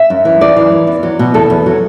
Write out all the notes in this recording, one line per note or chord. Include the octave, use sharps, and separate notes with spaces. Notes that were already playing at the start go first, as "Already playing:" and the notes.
Already playing: E5
F#2
E3
F#2 D5
E3
F#2
E2
F#3
B2
E2 A4
E2
F#3